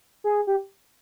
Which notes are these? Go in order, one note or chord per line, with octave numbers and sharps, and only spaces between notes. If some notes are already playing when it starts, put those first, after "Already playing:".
G#4
G4